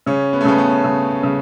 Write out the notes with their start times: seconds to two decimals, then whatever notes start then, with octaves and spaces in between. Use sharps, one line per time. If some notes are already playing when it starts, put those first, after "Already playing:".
0.06 C#3 C#4
0.33 B3
0.41 A3
0.45 C#3 B3
0.58 B3
0.84 C#3
1.23 C#3